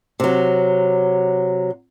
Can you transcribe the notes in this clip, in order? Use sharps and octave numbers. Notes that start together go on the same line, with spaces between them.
C3 F#3